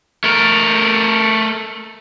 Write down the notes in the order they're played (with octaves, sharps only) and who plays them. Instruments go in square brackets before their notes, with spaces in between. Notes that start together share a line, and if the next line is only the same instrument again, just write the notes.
[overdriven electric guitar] A3 A#4